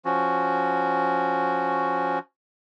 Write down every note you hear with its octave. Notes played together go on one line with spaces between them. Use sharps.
F3 C#4 F#4